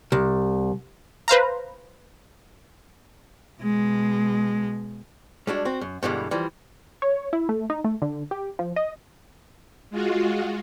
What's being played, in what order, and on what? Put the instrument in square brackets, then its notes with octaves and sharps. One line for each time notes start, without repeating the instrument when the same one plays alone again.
[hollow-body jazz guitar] C2
[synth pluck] B4 C5 F5 A#5
[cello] B2 G#3
[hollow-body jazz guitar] G3 G#3 D4 F#4
C4 F#4
F#2
G2 B2 D3 E3 G3 G#3
E3 F3 G3
[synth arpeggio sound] C#5
E4
A3
D#4
A3
D3
G4
F3
D#5
[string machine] G#3 F4 F#4